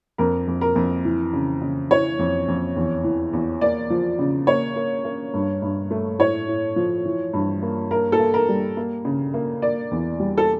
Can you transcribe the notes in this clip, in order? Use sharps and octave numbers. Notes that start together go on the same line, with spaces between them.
F2 A#4
F2
A#4
F2
E3
C#3
C#3
E3 C#5
F2
F2
E2
E3
E2
A#3 D5
F3
C#3
A#3 C#5
A#3
A#3
G2
G2
A3
A2 C#5
A2
F3
E3
G2
A#3
A#3 A#4
A4
A#3
A#4
G3
A#3
C#3
A#3
A#3 D5
E2
G3
A4